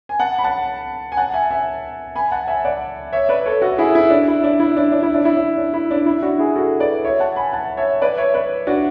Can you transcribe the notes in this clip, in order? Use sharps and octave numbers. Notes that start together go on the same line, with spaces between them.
G#5
F#5 A5
B5
F#5 A5
G#5
F#5 A5
E5 G#5
E5 G#5
G#5 B5
F#5 A5
E5 G#5
D5 F#5
C#5 E5
B4 D5
A4 C#5
F#4 A4
E4 G#4
E4
D4
E4
D4
E4
D4
D4
E4
D4
E4
D4
D4
E4
D4
E4
D4 F#4
E4 G#4
F#4 A4
B4 D5
C#5 E5
F#5 A5
G#5 B5
F#5 A5
C#5 E5
B4 D5
C#5 E5
B4 D5
D4 F#4